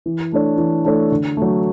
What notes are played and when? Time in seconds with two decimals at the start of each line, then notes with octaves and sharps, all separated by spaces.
0.06 E3
0.32 A3 D4 A4 C#5
0.58 E3
0.85 A3 D4 A4 C#5
1.11 D3
1.37 F#3 A3